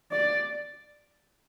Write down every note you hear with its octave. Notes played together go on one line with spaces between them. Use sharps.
D5